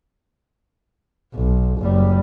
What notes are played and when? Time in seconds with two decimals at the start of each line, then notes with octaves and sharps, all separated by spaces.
1.34 B1
1.78 F#1 G3